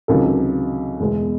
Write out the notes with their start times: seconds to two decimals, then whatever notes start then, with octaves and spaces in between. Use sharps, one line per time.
0.08 C#2 C3 D#3 F#3 A4
1.00 E2 B2 G#3